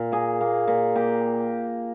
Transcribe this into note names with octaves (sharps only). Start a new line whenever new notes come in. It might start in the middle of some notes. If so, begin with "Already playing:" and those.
Already playing: A#2
A#3 G#4
A#3
A#2
A#3 G4